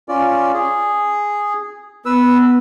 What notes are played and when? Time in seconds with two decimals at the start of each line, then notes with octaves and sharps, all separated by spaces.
0.09 C#4 F4 D5
0.54 G#4
2.05 B3 B4 E6